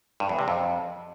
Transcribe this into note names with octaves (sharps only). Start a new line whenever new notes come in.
G2
E2
C3
F2